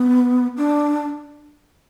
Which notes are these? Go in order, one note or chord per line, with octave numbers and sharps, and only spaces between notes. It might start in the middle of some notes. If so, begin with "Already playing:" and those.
Already playing: B3
D4